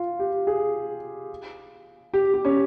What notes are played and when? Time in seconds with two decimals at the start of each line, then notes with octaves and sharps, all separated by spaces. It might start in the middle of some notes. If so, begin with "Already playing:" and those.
Already playing: F4
0.19 G4
0.47 G#4
2.14 G4
2.34 G4
2.45 C#4